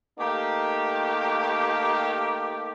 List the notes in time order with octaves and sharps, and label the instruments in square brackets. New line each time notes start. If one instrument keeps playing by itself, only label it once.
[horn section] A3 A#3 D#4 G4